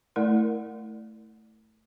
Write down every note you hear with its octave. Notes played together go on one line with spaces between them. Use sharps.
A3 E4 A#4 D5 F#5